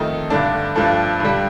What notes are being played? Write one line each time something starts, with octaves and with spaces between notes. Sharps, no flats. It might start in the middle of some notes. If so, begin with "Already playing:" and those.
Already playing: F2 D#3 A3 D#4
G2 D3 A3 D4
G2 F3 A3 D4 A4
G2 D3 G3